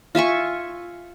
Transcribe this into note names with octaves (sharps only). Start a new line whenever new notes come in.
F4 E5 G#5 C#6